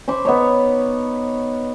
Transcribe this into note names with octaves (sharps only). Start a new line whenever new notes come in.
C5 B5 C#6 D6
B3 D#4 C#5